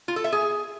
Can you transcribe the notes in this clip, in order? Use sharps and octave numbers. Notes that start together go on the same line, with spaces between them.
F4
A4
E5
G#4